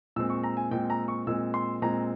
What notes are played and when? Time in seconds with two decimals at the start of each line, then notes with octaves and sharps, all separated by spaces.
0.16 A#2 G#3 C4 E6
0.30 C#6
0.43 A#5
0.57 G#5
0.71 A#2 G#3 C4 G5
0.90 A#5
1.08 C#6
1.27 A#2 G#3 C4 E6
1.54 C6
1.82 A#2 G#3 C4 A#5